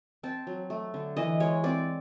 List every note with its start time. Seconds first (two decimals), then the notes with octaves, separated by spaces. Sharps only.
0.23 C4 A5
0.47 F#3
0.70 A3
0.94 D3
1.17 E3 D#5
1.40 G#3 C#5
1.64 C4 D5